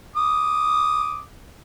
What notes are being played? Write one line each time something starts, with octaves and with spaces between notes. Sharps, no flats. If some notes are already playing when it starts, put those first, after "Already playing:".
D6 D#6